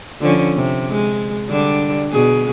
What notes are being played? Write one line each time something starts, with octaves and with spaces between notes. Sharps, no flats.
D3 F3 C#4
C3
G#3
D3 G3 D4
B2 G#4